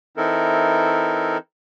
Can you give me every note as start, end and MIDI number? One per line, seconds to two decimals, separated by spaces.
0.17 1.38 52
0.17 1.38 60
0.17 1.38 63
0.17 1.38 64
0.17 1.38 69
0.17 1.38 70